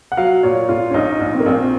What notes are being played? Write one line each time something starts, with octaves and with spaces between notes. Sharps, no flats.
F#5
F#3 F5
A#2 C#5
A#2 F4
C#4
A#1 D#4
A#1
C4
A#3
A#1 C4